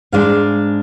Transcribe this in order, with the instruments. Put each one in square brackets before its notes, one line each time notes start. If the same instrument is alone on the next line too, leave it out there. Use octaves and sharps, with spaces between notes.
[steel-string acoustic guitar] G#2 G#3 D4 F5